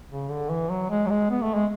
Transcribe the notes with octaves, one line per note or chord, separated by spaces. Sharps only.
C#3
D3
E3
F#3
G#3
F#3
G#3
B3
A3
G#3